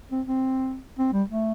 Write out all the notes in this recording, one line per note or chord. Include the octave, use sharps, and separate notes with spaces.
C4
C4
C4
G3
A3